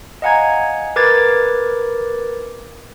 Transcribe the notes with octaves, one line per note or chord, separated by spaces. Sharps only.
D#5 F5 F#5 G#5 A#5 G#6
A#4 B4 D6 G#6 A6